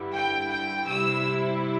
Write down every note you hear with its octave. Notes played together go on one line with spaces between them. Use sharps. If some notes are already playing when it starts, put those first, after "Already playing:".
Already playing: G2 D3 G3 E4
G5
G5
C3 G3 E4 E6